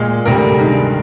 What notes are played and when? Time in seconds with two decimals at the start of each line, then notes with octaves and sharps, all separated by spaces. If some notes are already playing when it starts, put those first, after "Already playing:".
Already playing: A#2 G#3
0.25 D2 C3 G3 A#4
0.59 G2 D#3 G#3